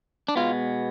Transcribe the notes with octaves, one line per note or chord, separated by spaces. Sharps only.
D4
B2 G#3 B3 F4